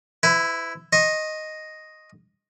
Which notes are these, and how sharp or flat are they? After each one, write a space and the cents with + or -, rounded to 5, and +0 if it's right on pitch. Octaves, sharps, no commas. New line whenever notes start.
E4 +0 B4 +40
D#5 +0 C#6 -45